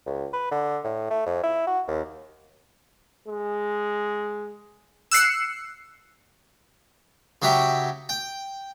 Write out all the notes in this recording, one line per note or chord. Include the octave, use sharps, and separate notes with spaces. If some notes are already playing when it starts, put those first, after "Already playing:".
C#2
B4
D3
A2
A3
F2
E4
F#4
D#2
G#3
E6 F#6 C7 C#7
C#3 F#3 G4 E5 G5
G5